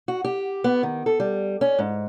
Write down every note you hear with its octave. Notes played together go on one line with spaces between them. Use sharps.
F#4
G4
B3
D#3
A4
G3
C#4
G#2